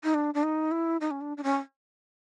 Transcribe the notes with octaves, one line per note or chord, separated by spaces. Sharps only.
D#4
D4
D4
D#4
E4
D#4
C#4
D4
D4
C#4